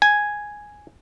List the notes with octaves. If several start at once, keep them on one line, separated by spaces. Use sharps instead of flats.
G#5